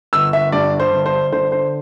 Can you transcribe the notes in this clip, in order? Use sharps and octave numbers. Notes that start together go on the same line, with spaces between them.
G1 E6
E5
G2 D5
C5
G1
C5
D3 C5
C5